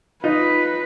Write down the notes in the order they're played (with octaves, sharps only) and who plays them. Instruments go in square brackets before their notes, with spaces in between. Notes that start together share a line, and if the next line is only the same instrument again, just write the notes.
[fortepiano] D#4 [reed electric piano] F4 [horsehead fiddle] B4